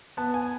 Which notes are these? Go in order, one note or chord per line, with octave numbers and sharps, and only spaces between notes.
B3 A5
G#5